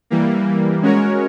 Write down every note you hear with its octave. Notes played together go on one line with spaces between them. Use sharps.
E3 G3 A#3
G#3 C#4 F#4 A#4 C#5